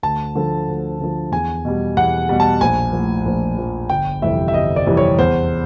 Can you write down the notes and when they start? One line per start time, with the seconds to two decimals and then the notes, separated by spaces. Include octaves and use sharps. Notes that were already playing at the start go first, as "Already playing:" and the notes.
0.03 D2 A5
0.35 D3 F3
0.68 D2
1.00 D3 F3
1.32 E2 G#5
1.65 B2 G3
1.97 E2 F#5
2.29 B2 G3
2.40 A5
2.61 A#1 G#5
2.93 A2 F3
3.26 A#1
3.58 A2 F3
3.90 G1 G5
4.22 F2 C3 E3 G3 E5
4.48 E5
4.54 G1 D#5
4.76 D5
4.86 F2 C3 E3 G3
4.97 C#5
5.18 E2 C5